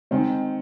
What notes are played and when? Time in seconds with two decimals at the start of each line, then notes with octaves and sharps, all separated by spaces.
0.11 D#3 G#3 C4